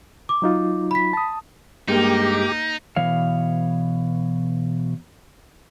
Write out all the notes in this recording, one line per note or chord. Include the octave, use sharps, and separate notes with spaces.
D6
F#3 D#4 F4
B5 B6
A5 D#6
G2 G#3 A#3 D#4 G4
B2 E3 C#5 F5